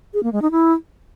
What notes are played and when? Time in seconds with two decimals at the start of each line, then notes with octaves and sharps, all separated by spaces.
0.14 G#4
0.23 A#3
0.32 G#3
0.42 D#4
0.51 E4